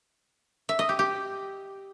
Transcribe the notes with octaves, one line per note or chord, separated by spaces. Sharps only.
E5
D#5
G4
G4